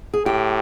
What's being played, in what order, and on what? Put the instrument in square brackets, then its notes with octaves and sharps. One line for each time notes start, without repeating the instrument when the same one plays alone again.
[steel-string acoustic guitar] G#4
[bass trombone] A2 [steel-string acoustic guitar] G4